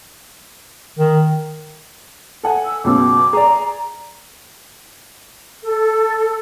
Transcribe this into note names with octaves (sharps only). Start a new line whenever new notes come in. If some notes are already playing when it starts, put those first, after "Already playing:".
D#3
A4 F#5 G#5
E6
C#2 F#2 B2 D6
G#4 D5 A#5
A4